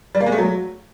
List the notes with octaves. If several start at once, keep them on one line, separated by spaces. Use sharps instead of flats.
G3
A#3
G#3
A3
F#3